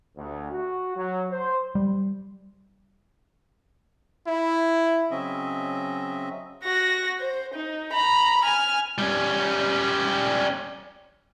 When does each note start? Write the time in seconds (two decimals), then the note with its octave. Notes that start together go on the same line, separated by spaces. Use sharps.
0.17 D2
0.52 F#4
0.96 F#3
1.31 C5
1.75 G3
4.27 E4
5.11 C#3 F#3 C4 C#4 D#5 E5
6.63 F#4 A#6
7.20 C5
7.54 D#4
7.93 A#5 B5
8.45 G#5 F6
8.98 G3 C#4